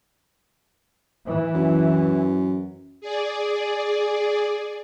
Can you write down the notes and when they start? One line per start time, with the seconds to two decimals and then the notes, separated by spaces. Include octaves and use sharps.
1.25 E3
1.55 F#2
3.01 G#4 D5